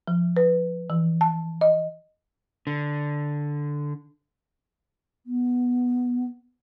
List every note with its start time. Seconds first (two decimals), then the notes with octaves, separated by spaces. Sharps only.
0.08 F3
0.37 B4
0.90 E3
1.21 A5
1.61 D#5
2.67 D3
5.26 B3